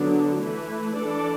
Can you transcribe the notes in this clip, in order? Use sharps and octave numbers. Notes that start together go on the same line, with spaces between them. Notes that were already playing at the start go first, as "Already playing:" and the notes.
Already playing: D3 F#3 B3 D4
E3 A3 E4 B4
E3 D4 A4 D5